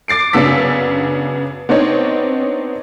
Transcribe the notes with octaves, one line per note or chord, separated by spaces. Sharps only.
D6 A6 C7 D7
F#2 C#3 B3 D4 E6 B6
B3 C4 D4 D#4 C#5